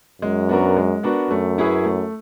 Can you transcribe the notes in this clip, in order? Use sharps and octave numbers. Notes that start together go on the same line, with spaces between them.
F#2 G#3
B3 D4 F#4 A#4
G#3
B3 D4 F#4 A#4
F#2 A3
C#4 E4 G#4 B4
A3